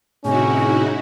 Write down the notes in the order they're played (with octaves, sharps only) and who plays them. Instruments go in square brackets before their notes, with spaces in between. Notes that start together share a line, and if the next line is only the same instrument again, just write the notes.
[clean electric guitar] A2 C3 [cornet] C#4 [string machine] D#4 E4 F#4 [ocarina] G#4